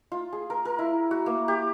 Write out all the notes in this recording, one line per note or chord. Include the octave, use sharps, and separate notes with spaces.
F4
G#4
A#4
A#4
E4
F#4
A#3
G4